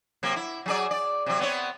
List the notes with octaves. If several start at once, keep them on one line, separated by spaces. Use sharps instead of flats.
C3 F#3 A#3
E4
F#3 G#4 D5
D5
C3 F#3
B3 C4 C#5